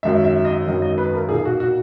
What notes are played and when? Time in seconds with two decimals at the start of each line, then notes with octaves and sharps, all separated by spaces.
0.03 G#1 F#2 D#3 F#3 E5
0.24 E5
0.45 D#5
0.66 G#1 F#2 D#3 F#3
0.82 D#5
0.98 B4
1.14 A#4
1.29 B1 A#2 A#3 D#4 G#4
1.39 G#4
1.45 F#4
1.60 F#4